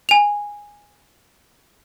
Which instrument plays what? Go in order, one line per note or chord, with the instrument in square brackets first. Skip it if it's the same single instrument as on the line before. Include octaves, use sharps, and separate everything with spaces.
[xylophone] G#5 F7